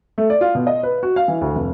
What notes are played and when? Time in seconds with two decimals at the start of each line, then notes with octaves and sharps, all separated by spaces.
0.18 A3
0.30 D5
0.41 F4
0.55 B2
0.67 D#5
0.83 B4
1.03 F#4
1.16 F5
1.28 E3
1.41 D2
1.55 F1